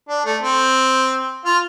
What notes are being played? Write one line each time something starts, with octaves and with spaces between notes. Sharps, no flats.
D4
A3
C4
F4